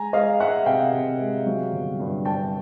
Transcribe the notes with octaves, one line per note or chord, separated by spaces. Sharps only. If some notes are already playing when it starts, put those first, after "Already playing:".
Already playing: G#3 G#5 A#5
G#3 D#5 F5
G#3 E5 F#5
C3 F5 G5
C3
G#3
F#3
G1
G2
G2 G5 A5